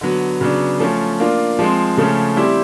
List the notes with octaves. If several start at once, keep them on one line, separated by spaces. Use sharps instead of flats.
D3 F#3 B3
C#3 F#3 B3 D4
F3 A3 C#4
A#3 D4 F4
F3 G#3 C4
C#3 F3 A3 C#4
G3 C4 E4 G4